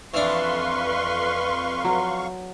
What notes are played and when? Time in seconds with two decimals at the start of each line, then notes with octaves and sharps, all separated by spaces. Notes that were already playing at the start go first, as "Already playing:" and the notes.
0.14 F2 E3 D4 B4 F5 C6 C#6
1.84 F#3